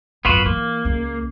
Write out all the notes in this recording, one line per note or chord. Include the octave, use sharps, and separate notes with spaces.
G#1 F#2 B3 F4 F#4
E3 A#3
C#2